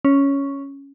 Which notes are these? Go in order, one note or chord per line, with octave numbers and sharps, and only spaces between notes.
C#4